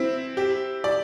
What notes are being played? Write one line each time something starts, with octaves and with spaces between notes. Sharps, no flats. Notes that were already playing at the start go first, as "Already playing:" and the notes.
Already playing: C4 E4
G4
D5